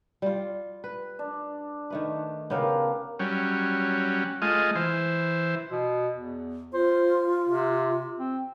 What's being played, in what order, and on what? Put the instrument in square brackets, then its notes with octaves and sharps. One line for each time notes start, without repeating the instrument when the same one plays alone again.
[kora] G3 F4
B4
[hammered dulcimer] D4
[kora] D#3 A3 B4
[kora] C#3 B3 [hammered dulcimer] G4 A#4 F5
[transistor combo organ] F#3 G3 C#4
G#3 A3 F4 D#5
E3 C5
[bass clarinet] B2
E2
[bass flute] F4 [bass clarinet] C5
[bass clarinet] C3
C4